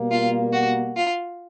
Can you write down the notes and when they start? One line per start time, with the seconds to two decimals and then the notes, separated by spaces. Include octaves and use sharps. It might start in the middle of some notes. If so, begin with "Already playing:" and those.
Already playing: B2 G3 A#3
0.11 F4
0.53 F#4
0.96 F4